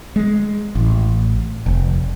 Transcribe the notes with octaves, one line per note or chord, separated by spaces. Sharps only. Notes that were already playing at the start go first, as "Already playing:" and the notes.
G#3
A1
F1